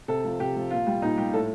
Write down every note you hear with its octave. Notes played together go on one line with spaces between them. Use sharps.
C3 A4
F3
C3 G4
F3
A#2 F4
G3
A#2 D#4
G3 G4
A2 A4